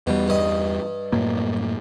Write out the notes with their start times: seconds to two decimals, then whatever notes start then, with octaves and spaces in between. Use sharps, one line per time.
0.07 E2 B2 G3
0.28 G2 D#5
1.12 F#2 A2 A#3